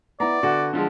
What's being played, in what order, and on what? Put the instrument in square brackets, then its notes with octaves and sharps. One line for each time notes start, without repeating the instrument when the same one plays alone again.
[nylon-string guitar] B3 E4 [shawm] D5 [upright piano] A#5
[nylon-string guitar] D3 [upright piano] F#4
[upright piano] D3 F3 G#3